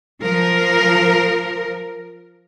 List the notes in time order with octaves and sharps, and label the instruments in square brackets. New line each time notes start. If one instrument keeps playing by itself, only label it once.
[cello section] F3 A#4